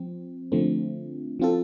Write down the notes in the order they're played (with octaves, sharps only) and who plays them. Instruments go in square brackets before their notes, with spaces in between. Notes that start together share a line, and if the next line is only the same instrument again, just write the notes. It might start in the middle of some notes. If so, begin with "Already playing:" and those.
Already playing: [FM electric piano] F3 C4
D3 F3 A3 C4
F3 C4 F4 A4